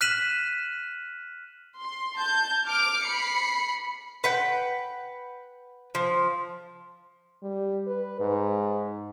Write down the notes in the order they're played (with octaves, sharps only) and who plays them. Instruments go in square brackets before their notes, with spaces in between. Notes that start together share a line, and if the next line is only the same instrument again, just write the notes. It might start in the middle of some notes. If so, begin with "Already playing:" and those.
[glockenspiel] F6 F#6 B6 D#7 E7 F#7
[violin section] C6
A5 G6
D6 F6 D7
B5 C7 C#7
[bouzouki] B4 F#5 G5
F3
[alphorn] G3
B4
G#2